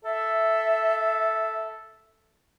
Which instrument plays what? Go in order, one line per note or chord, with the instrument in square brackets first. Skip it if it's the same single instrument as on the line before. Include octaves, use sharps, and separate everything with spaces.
[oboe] A4 [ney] E5